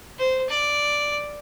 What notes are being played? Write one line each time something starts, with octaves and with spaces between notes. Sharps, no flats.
C5
D5